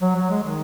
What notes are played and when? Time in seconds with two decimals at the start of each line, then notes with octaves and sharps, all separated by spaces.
0.02 F#3
0.16 F#3
0.30 G#3
0.43 D#3